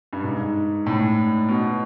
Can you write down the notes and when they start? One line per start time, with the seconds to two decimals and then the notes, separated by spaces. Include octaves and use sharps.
0.13 G2
0.24 G#2
0.86 A2
1.49 B2